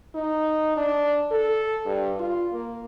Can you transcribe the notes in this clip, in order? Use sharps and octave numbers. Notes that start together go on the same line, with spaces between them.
D#4
D4
A4
G2
F4
A#3